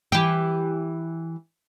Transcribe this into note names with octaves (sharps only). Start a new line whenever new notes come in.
E3 G4